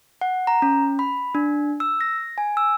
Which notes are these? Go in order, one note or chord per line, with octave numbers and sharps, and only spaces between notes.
F#5
A#5
C#4
B5
D4
E6
A#6
G#5
E6